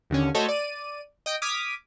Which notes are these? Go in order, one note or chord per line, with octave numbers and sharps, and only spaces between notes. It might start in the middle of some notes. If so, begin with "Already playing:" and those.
D#2 D3 C#4
A3 F#4 A4 C5 C#5 D#5
D5 D#7
D#5 G5
D6 D#6 F6 G#6 B6